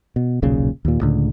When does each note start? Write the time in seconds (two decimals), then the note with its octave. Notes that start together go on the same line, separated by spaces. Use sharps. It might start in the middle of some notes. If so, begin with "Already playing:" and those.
0.16 B2
0.42 D#1 B1 A#2 C#3
0.85 D#2 A#2
1.01 C#2 A2 D3